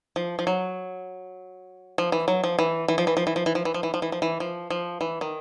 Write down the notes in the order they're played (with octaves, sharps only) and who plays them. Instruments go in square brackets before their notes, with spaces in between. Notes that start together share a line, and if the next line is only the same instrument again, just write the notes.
[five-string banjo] F3
F3
F#3
F3
E3
F#3
F3
E3
E3
F3
E3
F3
E3
F3
E3
F3
E3
F3
E3
F3
E3
F3
E3
F3
F3
E3
D#3